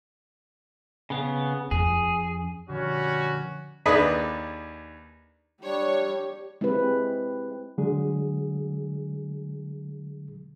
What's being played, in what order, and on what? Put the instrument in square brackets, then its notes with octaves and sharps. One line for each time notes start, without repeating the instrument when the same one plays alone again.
[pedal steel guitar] C#3 B3
[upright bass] F2 C#4 [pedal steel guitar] G#4
[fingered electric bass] D3 F3 [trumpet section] G3 C#4 F#4
[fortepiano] D#2 D4 G#4 B4 D#5
[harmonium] G3 D4 [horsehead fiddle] G4 [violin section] C#5
[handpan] G#3 C4 E4 G4 B4
[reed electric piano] D3 F#3 G#3 G#4